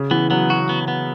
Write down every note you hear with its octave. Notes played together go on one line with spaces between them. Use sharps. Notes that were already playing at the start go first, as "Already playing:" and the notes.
Already playing: C#3
E3 B3
F#3 B3
F#4
B3
B3